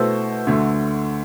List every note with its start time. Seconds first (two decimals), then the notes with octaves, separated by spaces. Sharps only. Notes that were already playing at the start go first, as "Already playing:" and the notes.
Already playing: B2 A3 E4 A4 C5
0.47 D2 D3 A3